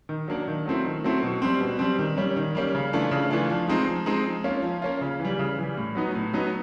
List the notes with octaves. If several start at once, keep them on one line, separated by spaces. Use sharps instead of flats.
D#3
F#3 A#3 D4
D#3
F#3 A3 C4 E4
D#3
F#3 A3 C4 E4
B2
G3 C4
B2
G3 C4
D#3
G3 A#3 C#4
D#3
G3 A#3 C#4
C#3
E3 A3 D4 F4
C#3
E3 A3 D4 F4
F3
G#3 C4 D#4
F3
G#3 C4 D#4
F3
A#3 C#4 F4
F3
A#3 C#4 F4
C#3
E3 G3
C#3
E3 G3
A2
F#3 B3 D#4
A2
F#3 B3 D#4